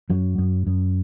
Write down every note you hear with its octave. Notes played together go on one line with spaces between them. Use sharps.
F#2 F#3
F#2
F#2